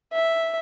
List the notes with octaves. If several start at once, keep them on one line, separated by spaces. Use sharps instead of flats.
E5